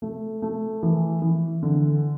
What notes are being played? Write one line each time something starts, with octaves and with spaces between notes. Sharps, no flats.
A3
A3
E3
E3
D3